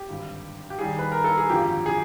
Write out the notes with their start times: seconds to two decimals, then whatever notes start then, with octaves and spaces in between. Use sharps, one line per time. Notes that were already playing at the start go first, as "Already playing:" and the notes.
Already playing: G4
0.08 G#1 G2 D3
0.70 G4
0.79 D#2 D#3 G3 G#4
0.99 B4
1.12 A#4
1.24 A4
1.37 G#4
1.50 G#1 F#2 D3 F3 G4
1.86 G#4